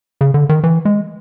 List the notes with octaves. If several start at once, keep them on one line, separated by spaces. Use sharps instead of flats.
C#3
D3
D#3
E3
G#3